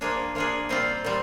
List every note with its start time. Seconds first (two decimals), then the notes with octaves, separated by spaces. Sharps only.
0.01 F3 A#3 D4 G#4
0.35 F3 A#3 D4 G#4
0.69 A#2 G3 C4 F4
1.05 A#2 G3 C4